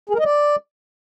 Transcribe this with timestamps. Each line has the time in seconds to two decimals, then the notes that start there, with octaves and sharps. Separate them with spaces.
0.09 G#4
0.14 A#4
0.20 D#5
0.25 D5